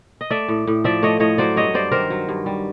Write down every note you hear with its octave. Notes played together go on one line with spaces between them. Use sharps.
D#5
A3 D5 E5
A2
A2
F3 D5 E5
A3 C#5 D#5
A2 C#5 D#5
F#3 C5 D5
G2 C#5 D#5
G2 C5 D5
D#3 A#4 C5
F#3
G2
G3